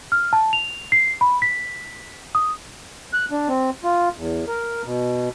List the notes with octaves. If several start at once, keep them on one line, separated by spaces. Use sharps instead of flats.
F6
A5
F7
C7
B5
B6
D#6
F#6
D4
C4
F4
E2
A#4
B2